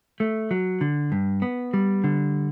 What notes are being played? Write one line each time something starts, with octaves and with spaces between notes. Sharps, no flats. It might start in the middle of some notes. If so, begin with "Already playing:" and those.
A3
F#3
D3
G2
B3
G3
D3